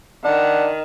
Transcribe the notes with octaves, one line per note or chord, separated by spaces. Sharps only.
D#3 D4 F#5